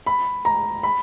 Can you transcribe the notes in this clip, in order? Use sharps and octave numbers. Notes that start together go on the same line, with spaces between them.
B5
A#5
B5